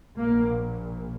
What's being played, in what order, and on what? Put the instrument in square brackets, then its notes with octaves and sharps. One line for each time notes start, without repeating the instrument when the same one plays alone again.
[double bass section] A#1 A#2 A#3